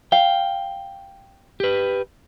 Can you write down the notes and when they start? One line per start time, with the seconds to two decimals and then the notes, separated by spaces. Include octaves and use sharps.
0.12 F5 G5
1.60 G4 B4